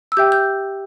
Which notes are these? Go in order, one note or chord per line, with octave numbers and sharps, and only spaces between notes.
E6
G4 E5 G5 G6
G6